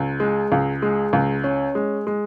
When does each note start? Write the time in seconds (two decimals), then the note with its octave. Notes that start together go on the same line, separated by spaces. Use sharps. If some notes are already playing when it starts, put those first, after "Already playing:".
Already playing: C#2
0.20 G#3
0.52 C#2
0.82 G#3
1.13 C#2
1.44 C#4
1.75 G#3
2.07 G#3